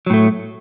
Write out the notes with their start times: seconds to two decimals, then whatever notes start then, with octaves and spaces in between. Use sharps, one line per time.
0.06 F#3
0.10 A2
0.14 A3